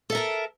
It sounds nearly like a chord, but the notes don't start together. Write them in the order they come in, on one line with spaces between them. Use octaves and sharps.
A4 E5 A#4 A5